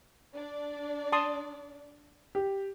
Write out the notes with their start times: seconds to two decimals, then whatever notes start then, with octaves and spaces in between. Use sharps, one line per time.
0.34 D4 D5
1.12 A5 C6 D#6
2.35 G4